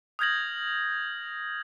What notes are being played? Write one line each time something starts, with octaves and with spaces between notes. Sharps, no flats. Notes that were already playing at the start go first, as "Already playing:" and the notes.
D#6 F6 G6 G#6 A#6 F#7